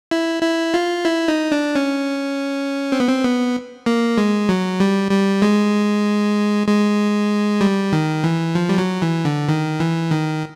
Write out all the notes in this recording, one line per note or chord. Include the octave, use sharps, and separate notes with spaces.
E4
E4
F4
E4
D#4
D4
C#4
C4
B3
C4
B3
A#3
G#3
F#3
G3
G3
G#3
G#3
G3
D#3
E3
F3
G3
F#3
E3
D3
D#3
E3
D#3